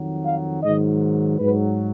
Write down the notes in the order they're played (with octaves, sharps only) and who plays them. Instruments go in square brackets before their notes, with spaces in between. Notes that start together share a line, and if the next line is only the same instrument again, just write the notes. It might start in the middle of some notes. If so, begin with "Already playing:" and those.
Already playing: [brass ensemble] F2 D#3 F#3
F5
G#2 D#3 F#3 D#5
G#2 F#3 B4